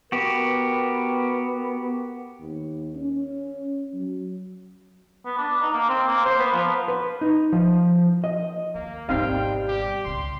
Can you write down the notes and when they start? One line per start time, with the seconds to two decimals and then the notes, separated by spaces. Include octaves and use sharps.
0.12 B3 F#4 G4 A#4
2.40 D#2
2.95 C#4
3.94 F#3
5.25 B3
5.37 D4
5.61 D#4
5.73 A#3
5.89 C4
6.07 A#3
6.25 C5
6.38 B3
6.52 F3
6.88 B4
7.21 D#4
7.52 F3
8.24 D#5
8.75 D#2 A#3
9.09 G#1 B2 G3 C4 D#4 F5 G5
9.68 G4
10.05 C#2 D4 C6